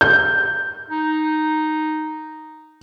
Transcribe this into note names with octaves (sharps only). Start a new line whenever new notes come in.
G6
D#4